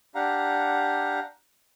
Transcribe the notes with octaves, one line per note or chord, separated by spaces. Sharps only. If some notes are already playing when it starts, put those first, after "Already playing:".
D4 G4 F5 F#5 A#5